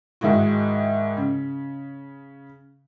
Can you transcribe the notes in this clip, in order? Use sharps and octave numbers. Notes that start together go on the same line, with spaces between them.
G#2 D#3 G#3 E4 F#4
C#3